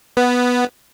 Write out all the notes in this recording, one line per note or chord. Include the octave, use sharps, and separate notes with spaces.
B3